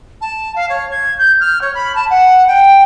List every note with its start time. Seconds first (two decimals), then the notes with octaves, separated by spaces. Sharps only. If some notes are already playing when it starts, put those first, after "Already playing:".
0.21 A5
0.55 F5
0.69 C#5
0.90 G#6
1.18 G6
1.40 F6
1.61 C#5
1.74 B5
1.95 A5
2.10 F#5
2.47 G5